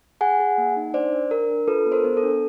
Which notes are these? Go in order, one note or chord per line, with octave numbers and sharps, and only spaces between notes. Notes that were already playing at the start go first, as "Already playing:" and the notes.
G#4 F#5 G#5
G#4
A#3
D#4
D4 C5 D5
D4
D4 A#4
D4
F4 A4 B4
B3
A#4 C5
B3
A4
D4